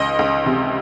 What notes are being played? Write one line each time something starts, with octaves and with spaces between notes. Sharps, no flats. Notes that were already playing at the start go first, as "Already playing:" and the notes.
Already playing: C#2 D#5
C#2
C3